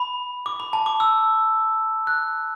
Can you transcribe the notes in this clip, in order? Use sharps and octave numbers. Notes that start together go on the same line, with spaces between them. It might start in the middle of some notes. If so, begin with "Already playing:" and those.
Already playing: B5
D6
B5
A5
D6
E6
F#6